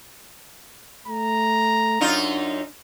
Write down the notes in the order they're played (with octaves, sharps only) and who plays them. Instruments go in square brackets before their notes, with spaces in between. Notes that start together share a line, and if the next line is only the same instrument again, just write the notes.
[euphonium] A3 [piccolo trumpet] A#5
[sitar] F#2 D#4 F4 [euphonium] D4